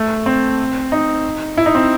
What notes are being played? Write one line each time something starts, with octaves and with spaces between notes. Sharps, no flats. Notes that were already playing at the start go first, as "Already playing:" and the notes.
Already playing: A3
C4
D#4
E4
D#4
C4